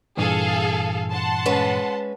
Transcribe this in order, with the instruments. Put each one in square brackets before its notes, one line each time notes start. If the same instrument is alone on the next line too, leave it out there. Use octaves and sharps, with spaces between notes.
[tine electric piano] G2 A#2 E3 [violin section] G#4 A4 F5
[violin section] F#5 A5 C6
[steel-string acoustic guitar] G#3 C#4 B4